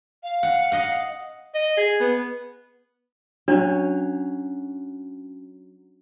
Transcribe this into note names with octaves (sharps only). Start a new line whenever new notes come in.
F5
F#5
D#5 F#5
D#5
G#4
B3
F#3 C#4 D4